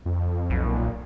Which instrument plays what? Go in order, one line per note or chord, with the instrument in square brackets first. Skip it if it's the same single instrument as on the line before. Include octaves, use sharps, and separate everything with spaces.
[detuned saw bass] F2
[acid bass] B1
[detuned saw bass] A#2